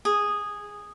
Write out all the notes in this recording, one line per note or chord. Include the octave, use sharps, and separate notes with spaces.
G#4